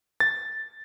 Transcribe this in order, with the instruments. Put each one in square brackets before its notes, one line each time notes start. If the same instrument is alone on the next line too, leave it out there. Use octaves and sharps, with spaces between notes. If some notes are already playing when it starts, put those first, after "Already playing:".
[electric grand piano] A6